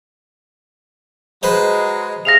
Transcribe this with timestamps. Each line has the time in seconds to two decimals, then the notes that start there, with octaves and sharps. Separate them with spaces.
1.43 F#3 G#3 B4 C5 D#5
2.25 C3 G#4 F5 A#6 F7